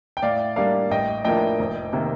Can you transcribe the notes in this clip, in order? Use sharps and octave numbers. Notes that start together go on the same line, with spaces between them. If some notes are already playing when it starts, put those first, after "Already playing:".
G5
A2 D5 F5
G3 A#3 D4 D5 F5
A1 D#5 G5
A2 F3 A#3 D4 D#5 G5
F1
C3 D#3 A#3